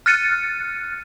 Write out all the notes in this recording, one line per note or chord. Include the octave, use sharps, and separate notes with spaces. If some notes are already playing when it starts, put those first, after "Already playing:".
F6 F#6 A6 C#7 D#7